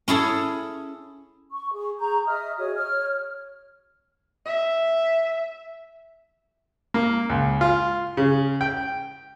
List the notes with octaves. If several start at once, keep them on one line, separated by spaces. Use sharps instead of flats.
C#4 E4 G#4 A4
C#6
G#4
G#4 A#5 C#6 G6
D#5 E5 D#6 F6
F#4 G#4 C#5 D#6
C#5 F6
E5
A#3
C#2
F4
C#3
G5